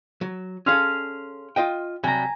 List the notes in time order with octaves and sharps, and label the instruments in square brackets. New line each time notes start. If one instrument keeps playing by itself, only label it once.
[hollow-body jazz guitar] F#3
[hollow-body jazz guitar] C#4 G#4 A4 [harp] F5 C6 F6
[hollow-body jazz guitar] F4 D#5 G5
[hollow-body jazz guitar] C3 F#3 G3 [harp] G#5 A#5